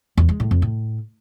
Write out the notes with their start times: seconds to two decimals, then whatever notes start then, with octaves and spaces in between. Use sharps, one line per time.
0.17 E2
0.29 G#3
0.40 A2
0.51 F2
0.62 A2